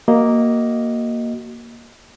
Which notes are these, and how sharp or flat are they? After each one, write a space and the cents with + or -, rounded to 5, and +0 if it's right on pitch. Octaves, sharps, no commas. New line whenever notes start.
A#3 +0 F#4 +20 D#5 +0